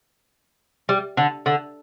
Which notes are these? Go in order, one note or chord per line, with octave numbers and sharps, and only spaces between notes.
G3
D3
D3